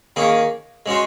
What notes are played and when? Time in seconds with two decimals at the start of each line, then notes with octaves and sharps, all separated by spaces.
0.16 D#3 A#3 C#4 G#4
0.86 G#3 C#4 F#4 C5